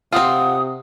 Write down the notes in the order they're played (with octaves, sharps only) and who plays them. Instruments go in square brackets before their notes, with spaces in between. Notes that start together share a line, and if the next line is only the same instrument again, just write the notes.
[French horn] C3 [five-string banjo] C4 F4 [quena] F#5 [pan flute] D#6